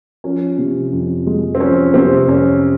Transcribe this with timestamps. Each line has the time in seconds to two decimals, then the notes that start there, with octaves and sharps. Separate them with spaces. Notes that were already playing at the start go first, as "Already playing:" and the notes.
0.24 F3 C#4
0.58 C3
0.92 F2
1.27 G#3
1.55 C4
1.60 F3 C#4
1.94 C3 C4
2.28 F2 C#4